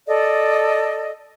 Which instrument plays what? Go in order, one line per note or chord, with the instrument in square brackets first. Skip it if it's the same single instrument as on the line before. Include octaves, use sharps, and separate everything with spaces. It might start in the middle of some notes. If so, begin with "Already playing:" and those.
[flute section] A4 D5 D#5